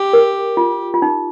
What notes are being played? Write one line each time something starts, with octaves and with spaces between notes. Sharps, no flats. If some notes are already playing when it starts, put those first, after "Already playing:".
Already playing: G4
A#4
F4
F4
D#4